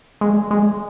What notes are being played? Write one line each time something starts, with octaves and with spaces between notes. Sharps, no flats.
G#3
G#3